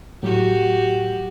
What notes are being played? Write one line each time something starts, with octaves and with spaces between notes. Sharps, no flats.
A2 F#3 F#4 G4